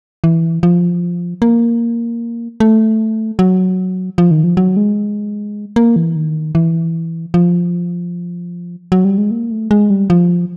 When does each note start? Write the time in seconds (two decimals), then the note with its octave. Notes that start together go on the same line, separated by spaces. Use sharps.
0.24 E3
0.63 F3
1.42 A#3
2.60 A3
3.39 F#3
4.18 F3
4.31 D#3
4.44 F3
4.57 F#3
4.77 G#3
5.76 A#3
5.96 E3
6.16 D#3
6.55 E3
7.34 F3
8.92 F#3
9.05 G3
9.18 G#3
9.31 A#3
9.51 A3
9.71 G#3
9.90 G3
10.10 F3